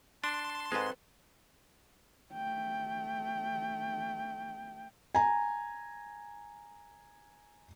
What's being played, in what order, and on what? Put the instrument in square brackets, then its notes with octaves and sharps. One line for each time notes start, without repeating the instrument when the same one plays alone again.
[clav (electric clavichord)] D4 [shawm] A5 [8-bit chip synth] C6
[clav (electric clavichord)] G#2 G#3 [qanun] C4 A4 B4
[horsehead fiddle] A3 G5
[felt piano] G#5 A#5